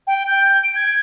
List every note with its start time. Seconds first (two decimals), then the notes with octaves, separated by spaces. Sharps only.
0.07 G5
0.27 G6
0.63 D7
0.75 G#6